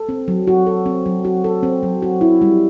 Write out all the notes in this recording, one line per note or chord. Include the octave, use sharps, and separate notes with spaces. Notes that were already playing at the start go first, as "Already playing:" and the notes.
Already playing: A4
C4
F#3
F#4
A4
C4
F#3
F#4
A4
C4
F#3
F#4
E4
G3